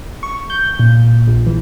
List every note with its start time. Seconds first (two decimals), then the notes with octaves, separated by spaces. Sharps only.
0.23 C#6
0.50 G6
0.79 A#2
1.28 A#1
1.47 E3